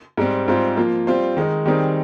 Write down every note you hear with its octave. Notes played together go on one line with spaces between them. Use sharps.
G#2 G3 C4
G#2 G3 C4 F4 C5
F3 A#3 F4
G3 C4 F4 C5
D#3 G#3 D#4
D#3 G3 C4 D#4 G#4